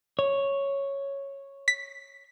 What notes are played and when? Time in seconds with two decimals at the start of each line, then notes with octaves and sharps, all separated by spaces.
0.19 C#5
1.68 B6